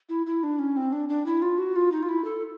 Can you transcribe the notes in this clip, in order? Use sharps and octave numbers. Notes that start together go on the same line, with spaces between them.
E4
E4
D4
C#4
C4
D4
D4
E4
F4
F#4
F4
D#4
F4
E4
A4